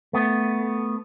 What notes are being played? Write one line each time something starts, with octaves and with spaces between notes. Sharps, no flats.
A3 B3